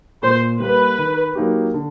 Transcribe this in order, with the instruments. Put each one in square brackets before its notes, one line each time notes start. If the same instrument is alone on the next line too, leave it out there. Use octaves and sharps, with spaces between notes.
[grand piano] A#2 [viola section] C5
[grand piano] G3 A#3 [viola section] B4
[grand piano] D#3
F#3 A#3 D#4 G4
D3